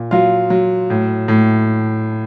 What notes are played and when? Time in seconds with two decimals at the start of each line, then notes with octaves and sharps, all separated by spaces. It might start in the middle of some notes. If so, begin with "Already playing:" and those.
Already playing: A#2
0.11 F#3 F4 F5
0.50 F#3
0.90 A2
1.28 A2